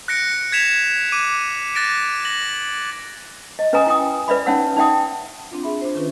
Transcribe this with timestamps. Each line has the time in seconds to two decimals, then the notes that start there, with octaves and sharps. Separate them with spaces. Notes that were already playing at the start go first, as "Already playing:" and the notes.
0.08 F#6 A#6 C#7 D7
0.52 G#6 B6 E7 F7
1.12 D6 D#7
1.75 F#6 A6 A#6 D7
2.25 A#6 F#7
3.59 D#5
3.73 C#4 B4 D#5 G#5 A#5 D#6
3.87 E4 G5 D#6
4.28 B4 D5 E5 B5
4.46 C#4 D#4 C#5 F#5 E6
4.77 D#4 D5 E5 G5 D#6
5.51 C4 D4 F4
5.64 G#4 E5 B5
5.81 D4 C5
5.95 D#3 C#4 F4 B4